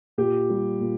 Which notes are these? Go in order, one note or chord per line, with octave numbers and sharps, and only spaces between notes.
A#2 G4
G3
A#2